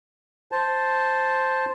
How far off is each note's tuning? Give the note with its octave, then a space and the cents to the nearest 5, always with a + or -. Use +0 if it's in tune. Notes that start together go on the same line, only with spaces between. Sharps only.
C5 +0 A5 +0